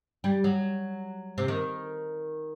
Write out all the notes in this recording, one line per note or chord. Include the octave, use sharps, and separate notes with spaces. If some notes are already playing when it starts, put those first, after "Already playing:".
G3
F#3
C3
D#3